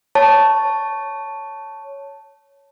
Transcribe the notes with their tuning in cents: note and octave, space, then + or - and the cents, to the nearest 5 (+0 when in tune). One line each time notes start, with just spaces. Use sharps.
C#5 +0 A5 +0